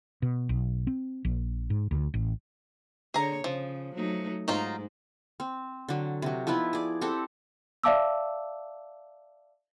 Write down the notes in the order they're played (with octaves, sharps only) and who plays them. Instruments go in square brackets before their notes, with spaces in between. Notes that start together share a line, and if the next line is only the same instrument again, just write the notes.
[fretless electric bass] B2
B1
C4
A#1
G#2
D2
A1
[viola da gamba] D3 C#5 [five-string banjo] G#4 A#5
[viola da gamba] C#3 [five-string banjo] F3
[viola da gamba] F#3 A3 D#4
[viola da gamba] G#2 [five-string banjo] F#3 D#4 F4
[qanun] C4
D3 F#3
C3 F#3
F3 B3 D#4 E4
G#4 D5
C4 G4 A4 F#5
[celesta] D5 E5 F5 A5 D6 E6